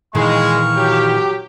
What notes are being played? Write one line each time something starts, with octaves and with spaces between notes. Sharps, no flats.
A#2 D#3 E3 G#3 F5 C#6
F#3 G4